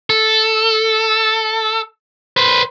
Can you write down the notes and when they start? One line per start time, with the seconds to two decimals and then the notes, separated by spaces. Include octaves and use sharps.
0.10 A4
2.37 B4 C5